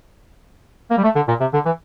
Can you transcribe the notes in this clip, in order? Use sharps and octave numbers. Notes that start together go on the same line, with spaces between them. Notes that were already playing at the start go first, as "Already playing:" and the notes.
A#3
G3
A3
D3
A#2
C3
D3
E3